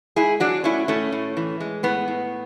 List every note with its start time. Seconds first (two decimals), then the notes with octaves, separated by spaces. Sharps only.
0.16 G#2 E4 G#4
0.40 F#3 D4 F#4
0.64 A3 C#4 E4
0.88 A2 A3 C#4
1.12 A2
1.37 E3
1.60 G#3
1.83 A2 B3
2.08 A2